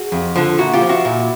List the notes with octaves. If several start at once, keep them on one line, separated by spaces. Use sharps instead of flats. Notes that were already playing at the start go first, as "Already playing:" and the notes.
Already playing: F#4 G#4
F2
D3 F3
A#2 E4 F#4
F4 G4
F3
E4 F#4
A#2